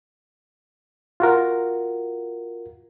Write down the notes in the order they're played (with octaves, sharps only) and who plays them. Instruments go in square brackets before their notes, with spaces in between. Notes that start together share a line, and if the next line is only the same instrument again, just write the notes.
[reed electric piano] F4 F#4 A#4